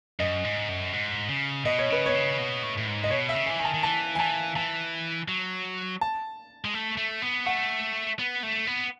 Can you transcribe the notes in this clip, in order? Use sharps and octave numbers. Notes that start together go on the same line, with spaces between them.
F#2 D#5
G#2
F#2
G#2
C#3
B2 D#5
C#5
C#3 B4
B2 C#5
C#3
B2
A2
A2
G#2
D#5
B2 C#5
E5
C#3
G#5
E3
D#3 G#5
A5
D#3
E3 A5
G#5
E3 A5
E3 A5
F#3
A5
G#3
A3
A3
B3
A3 F#5
B3
A3
B3